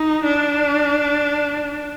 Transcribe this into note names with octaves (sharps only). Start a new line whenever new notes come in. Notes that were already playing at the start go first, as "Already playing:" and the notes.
Already playing: D#4
D4